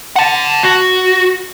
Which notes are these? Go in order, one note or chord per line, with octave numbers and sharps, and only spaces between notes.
F#5 A5
F#4